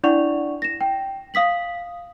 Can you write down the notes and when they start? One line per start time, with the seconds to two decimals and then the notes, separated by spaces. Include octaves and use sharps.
0.04 D4 E4 D5 F#5 C#6 F7
0.62 A#6 E7
0.81 G5
1.34 F5 D#6 B6 F#7